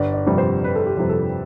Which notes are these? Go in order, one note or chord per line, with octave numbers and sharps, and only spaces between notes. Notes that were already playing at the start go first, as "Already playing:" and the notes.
Already playing: G1 D5
D5
F2 C3 G3
C5
G1 B4
A4
G4
F2 C3 G3
A4